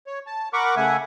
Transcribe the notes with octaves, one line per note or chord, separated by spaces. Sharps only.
C#5
A5
A#4 F#5 B5 C#6 D6
C#3 A3 E5 F#5 G#5